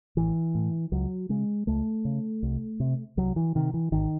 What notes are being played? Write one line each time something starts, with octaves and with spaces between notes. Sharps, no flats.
A1 E3
A2
C#2 F#3
C#3 G#3
C#2 A3
C#3
C2
C3
C2 F#3
E3
C3 D#3
E3
G#1 D#3